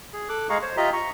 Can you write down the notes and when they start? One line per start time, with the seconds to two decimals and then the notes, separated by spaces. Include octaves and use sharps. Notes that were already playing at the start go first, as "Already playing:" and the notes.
0.13 G#4
0.29 A4 D6 F#6
0.50 G#3 G#4 F5 A#5 C#6
0.62 C5 C#5
0.77 F4 G4 D#5 E5 A#5
0.93 A#5 C#6